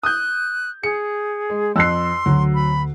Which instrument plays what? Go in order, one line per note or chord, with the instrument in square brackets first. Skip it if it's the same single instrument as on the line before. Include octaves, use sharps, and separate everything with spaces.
[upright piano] D#6 G6 [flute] F#6
[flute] G#4 [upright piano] C#7
[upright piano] G#3
[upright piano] F2 [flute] C6 [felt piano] E6 F#6 C7
[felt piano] D2 [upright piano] F#3
[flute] B5